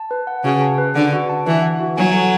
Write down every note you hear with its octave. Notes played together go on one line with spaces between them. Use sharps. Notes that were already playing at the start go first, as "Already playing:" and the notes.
Already playing: A5
B4
F#5
C#3 F#4
A5
B4
D3 F#5
F#4
A5
E3 B4
F#5
F#4
F#3 G#5
A4